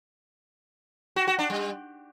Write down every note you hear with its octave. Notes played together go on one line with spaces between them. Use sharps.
F#4
F#4
D4
G3